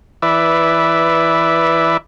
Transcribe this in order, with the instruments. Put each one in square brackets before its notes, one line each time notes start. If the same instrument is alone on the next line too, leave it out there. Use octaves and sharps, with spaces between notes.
[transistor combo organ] E3 B4 D5 E5